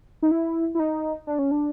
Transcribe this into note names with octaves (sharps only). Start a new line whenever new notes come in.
D#4
E4
E4
D#4
D4
C#4
D4